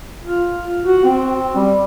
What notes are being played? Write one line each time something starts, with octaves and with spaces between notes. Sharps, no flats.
F4
F#4
C4
G3